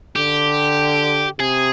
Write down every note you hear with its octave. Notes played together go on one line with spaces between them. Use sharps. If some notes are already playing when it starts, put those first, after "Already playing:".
D3 G4
C3 G#4